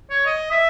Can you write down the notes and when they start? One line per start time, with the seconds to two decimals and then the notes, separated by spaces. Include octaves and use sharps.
0.10 C#5
0.26 D#5
0.50 E5